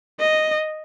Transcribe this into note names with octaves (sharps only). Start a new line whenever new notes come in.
D#5